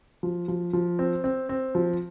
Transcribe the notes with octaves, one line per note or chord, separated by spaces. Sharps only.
F3
F3
F3
C4
C4
C4
F3